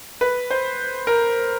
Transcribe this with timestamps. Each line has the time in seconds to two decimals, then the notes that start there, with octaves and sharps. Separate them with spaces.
0.21 B4
0.50 C5
1.07 A#4